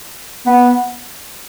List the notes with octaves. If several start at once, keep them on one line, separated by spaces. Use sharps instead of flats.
B3